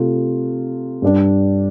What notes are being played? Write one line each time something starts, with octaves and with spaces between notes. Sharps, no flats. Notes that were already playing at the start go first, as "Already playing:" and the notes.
Already playing: C3 A3 F4
G2 G3 D4